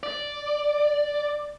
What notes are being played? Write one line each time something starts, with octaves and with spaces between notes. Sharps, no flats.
D5